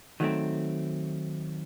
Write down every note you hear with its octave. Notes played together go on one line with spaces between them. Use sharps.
D#3 F#3 A3 C4